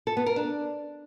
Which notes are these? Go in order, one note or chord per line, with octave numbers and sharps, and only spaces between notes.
A4
B3
A#4
D4